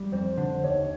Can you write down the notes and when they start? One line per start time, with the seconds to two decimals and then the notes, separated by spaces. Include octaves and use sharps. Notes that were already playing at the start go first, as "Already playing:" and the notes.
Already playing: G3
0.12 F2 C5
0.37 D3
0.63 D#2 C#5